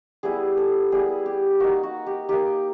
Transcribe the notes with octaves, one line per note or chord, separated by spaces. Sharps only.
G3 B3 E4 G#4
A4
G3 B3 E4 G#4
G4
A#3 D#4 F#4
F#4
G4
A#3 D#4 G4